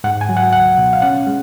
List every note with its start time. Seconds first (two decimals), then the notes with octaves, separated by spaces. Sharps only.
0.04 G#2 F#5
0.21 G#5
0.29 F#3
0.37 F#5
0.53 C#2 F#5
0.77 B2
0.93 F5
1.02 C#4 F#5
1.27 G#3